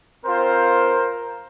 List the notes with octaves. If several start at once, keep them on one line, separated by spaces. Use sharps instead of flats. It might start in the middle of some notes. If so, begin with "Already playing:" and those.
C4 F4 A#4 C5